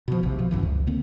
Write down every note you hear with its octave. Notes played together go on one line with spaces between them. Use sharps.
B2 F3
D#1 A#1 C3
B2 F3
G#1 F#2 D#3 E3
C#2
D3 A#3 C4